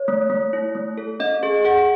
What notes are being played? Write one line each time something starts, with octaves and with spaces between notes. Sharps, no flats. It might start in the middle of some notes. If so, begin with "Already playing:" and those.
Already playing: C#5
A3
A3
E4
A3
A4
C#4 D#5
G#4
G#4 F#5